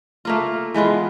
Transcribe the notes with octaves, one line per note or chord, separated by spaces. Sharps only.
A3 A#3 F4
E3 G#3 B3 F4